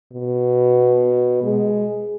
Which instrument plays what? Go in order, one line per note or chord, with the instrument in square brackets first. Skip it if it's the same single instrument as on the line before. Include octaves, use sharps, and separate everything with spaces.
[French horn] B2
G#3